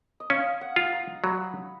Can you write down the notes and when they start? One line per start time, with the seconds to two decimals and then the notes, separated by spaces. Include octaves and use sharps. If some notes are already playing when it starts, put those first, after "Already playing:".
0.20 D#5
0.30 C#4 F5
0.61 F#5
0.76 F4
0.93 A#5
1.23 F#3 B5